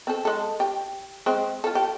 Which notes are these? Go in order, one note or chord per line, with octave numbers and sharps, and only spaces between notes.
C4 A4
G#3 A4
G4
G#3 C4
F4 A4
G4